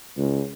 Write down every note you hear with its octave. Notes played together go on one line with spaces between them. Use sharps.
C#2